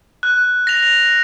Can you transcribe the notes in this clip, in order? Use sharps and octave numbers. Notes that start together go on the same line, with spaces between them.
F#6
A#6 F7